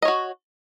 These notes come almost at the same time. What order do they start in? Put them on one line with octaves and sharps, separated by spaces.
D#5 C#5 F#4